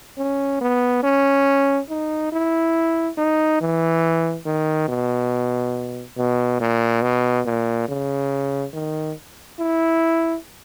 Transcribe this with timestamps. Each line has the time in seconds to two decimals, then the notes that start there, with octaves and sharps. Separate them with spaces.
0.18 C#4
0.61 B3
1.03 C#4
1.90 D#4
2.33 E4
3.18 D#4
3.61 E3
4.46 D#3
4.88 B2
6.17 B2
6.60 A#2
7.02 B2
7.46 A#2
7.89 C#3
8.74 D#3
9.60 E4